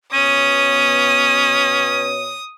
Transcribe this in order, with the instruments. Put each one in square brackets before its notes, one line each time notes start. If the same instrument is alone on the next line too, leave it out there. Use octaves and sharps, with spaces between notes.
[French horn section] B2 B3 C#5 [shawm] C#4 [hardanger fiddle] D#6 [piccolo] D#7